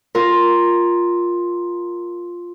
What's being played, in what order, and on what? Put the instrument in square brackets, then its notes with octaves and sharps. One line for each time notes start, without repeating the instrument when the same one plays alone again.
[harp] F4 A#4